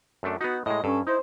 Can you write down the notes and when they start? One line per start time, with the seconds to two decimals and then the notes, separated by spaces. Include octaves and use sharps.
0.23 F#2 A3 D4
0.41 B3 D#4 F#4
0.66 A2 G#3 D#5
0.84 G2 C#4 A4
1.07 D#4 E4 C5